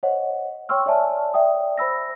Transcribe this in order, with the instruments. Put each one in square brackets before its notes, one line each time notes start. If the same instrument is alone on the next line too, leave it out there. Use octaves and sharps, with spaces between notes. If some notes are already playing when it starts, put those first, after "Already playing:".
[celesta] C5 C#5 D#5 F#5
C#5 G5 C6 C#6 E6 F6
C#5 D5 E5 G#5 A5
D5 E5 G5 D#6
C5 B5 E6 A#6